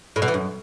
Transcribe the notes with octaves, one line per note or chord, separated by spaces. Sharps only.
A2
B2
E3
F#2